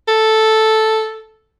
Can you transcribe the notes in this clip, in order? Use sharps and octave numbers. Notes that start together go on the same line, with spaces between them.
A4